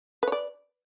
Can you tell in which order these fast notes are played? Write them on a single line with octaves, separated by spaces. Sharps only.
B4 C#5 D5